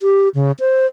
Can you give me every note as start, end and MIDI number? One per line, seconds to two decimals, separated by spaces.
0.01 0.29 67
0.35 0.52 49
0.60 0.86 72